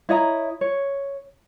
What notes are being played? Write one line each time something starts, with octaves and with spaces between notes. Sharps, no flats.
E4 C#5 D#5 A#5
C#5